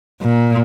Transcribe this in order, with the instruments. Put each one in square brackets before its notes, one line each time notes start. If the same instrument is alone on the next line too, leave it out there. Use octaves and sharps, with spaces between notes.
[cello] A#2